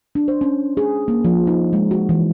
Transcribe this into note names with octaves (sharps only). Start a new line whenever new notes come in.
D4
C5
C#4
G#4
A#3
F3
D#4
G#3
F#4
E3